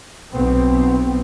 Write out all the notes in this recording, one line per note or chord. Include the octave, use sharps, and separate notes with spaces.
B1 B2 B3 C4